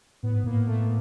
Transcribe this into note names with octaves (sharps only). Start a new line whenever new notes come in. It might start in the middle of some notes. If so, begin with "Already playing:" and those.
A2 B3
G#2
A2 A#3
A3